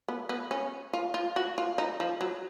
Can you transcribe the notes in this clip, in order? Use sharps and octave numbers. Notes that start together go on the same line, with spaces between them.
B3
B3
C#4
F4
F4
F#4
F4
D#4
F3
F#3